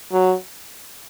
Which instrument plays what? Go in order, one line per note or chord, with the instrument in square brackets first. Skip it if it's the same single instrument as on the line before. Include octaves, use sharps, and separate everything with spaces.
[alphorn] F#3